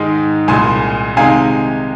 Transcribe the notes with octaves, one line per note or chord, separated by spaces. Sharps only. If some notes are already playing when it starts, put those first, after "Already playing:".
Already playing: G#2 D#3 G#3 D#4
C2 A#2 G#3 G#5 C6
C3 D#3 G#3 D#4 F5 G#5